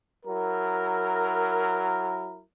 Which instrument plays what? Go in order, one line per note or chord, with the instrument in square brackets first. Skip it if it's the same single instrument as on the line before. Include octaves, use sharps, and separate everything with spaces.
[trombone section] F#3 E4 A#4